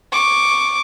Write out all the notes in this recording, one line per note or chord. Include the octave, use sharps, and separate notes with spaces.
C#6 D6